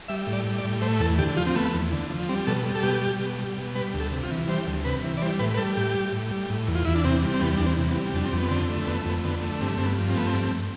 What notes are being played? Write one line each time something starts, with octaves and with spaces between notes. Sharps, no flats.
G3 E5
A2
D5
G3
D5
A2
A3 C5
E2 A4
D3 G4
F3 F4
C4
A3 B3
E2
D3
F3
G3 C4
B2 A4
G3
A4
B2 G4
G3
B2
G3
B2
G3 B4
D2
A4
C3
F4
E3
G3 C5
D2
C3 B4
E3
D5
G3 C5
A2 B4
B4
G3 A4
A2 G4
G3
A2
G3
A2
E2
F4
E2 E4
D4
C3 C4
G3
C4
E2 B3
E2 D4
C4
C3
B3
G3
F2 D4
C4
F2 B3
D3 C4
A3
F2 B3
F2 B3
D3 B3
A3
G2 C4
G2 C4
B3
F3
C4
A3 B3
C4
G2